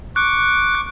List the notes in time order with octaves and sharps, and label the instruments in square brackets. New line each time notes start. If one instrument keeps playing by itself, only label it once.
[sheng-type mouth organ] C#6 D6 [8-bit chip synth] F#6